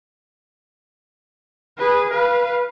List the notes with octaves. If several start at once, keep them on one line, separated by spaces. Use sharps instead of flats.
G#4 B4
B4 F5